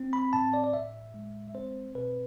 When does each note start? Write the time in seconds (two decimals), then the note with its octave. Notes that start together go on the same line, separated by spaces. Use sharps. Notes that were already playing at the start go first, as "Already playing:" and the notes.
Already playing: C4
0.13 B5
0.33 A2 A5
0.54 D5
0.64 D5
0.73 A2 E5
1.14 G#3
1.54 C4 C5
1.95 B2 B4